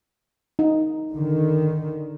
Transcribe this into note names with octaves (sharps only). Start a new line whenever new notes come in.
D#4
D3 D#3